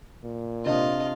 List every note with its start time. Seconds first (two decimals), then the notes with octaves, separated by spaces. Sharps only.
0.24 A#2
0.66 C3 C4 D4 F4 D#5 F5